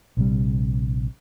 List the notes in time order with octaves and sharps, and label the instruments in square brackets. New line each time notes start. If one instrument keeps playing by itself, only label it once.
[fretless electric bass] A#1 C3 G3